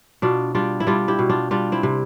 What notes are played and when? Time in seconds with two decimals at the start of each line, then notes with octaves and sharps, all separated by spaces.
0.22 B2 D4 F4
0.55 G3 D4 F4
0.80 E4
0.87 G3 D4 F4
1.08 E4 G4
1.19 B2
1.29 D4 F4
1.51 G3 D4 F4
1.72 C4 E4
1.83 C3